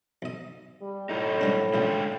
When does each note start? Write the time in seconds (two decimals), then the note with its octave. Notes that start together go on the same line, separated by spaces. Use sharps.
0.22 B1 D#5
0.81 G3
1.09 F#2 A2 A3 D#4
1.41 G#2 G3 D4
1.74 F#2 A#2 D3 E3 G#3 G5